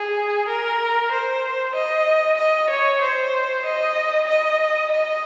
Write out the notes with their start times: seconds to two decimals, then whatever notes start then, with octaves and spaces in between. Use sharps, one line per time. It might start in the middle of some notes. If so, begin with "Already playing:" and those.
Already playing: G#4
0.48 A#4
1.11 C5
1.75 D#5
2.38 D#5
2.69 C#5
3.01 C5
3.65 D#5
4.28 D#5
4.92 D#5